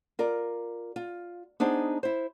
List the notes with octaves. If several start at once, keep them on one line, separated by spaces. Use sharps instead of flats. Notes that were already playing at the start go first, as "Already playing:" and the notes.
F4 A#4 D5
F4
B3 D4 D#4 G#4 C5
E4 C5